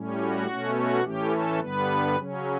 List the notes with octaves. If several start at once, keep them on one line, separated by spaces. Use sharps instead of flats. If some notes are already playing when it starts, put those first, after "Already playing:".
Already playing: A2 G3 C#4
F#4
B2 A3 C#4
F#4
A2 E3 A3 C#4 G4
A4
G2 D3 G3 B3 B4
C#3 F#3 C#4